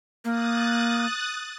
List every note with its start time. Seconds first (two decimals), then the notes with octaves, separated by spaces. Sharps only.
0.25 A#3 D#6 F#6 A6